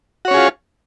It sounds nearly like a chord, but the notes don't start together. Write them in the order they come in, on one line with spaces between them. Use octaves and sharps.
F#4 C#5 C#4 G#4 F4